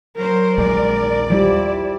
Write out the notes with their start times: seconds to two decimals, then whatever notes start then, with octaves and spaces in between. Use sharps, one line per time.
0.16 F#3 A#4 C5
0.58 A#1 D#2 G#3 D5
1.30 F3 G3 E4